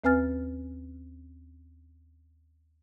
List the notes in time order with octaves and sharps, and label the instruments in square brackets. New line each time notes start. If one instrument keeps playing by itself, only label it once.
[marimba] D#2 C4 B4 G#5 F6 A6